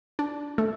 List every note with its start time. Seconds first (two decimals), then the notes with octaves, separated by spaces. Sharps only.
0.19 D4
0.58 A3